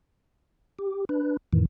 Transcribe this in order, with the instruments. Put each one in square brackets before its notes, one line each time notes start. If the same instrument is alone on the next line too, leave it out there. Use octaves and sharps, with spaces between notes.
[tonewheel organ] G4
D4 B4
F2 A2 D#3 E3